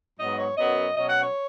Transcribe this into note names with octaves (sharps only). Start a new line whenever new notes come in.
G#2 F#3 B3 D#5
C#5
F#2 F#3 B3 D#5
B2 F#3 C#4 D#5
F#5
C#5